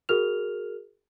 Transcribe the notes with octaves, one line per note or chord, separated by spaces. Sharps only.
F#4 G#4 A#4 F6 F7